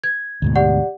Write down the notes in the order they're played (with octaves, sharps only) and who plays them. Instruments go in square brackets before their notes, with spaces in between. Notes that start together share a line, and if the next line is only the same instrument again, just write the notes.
[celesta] G#6
[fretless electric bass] D2 G#2 B2
[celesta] G4 D5 F#5